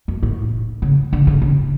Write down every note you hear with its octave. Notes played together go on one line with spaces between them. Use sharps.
F#2
A2
C#3
D3
C#3
C#3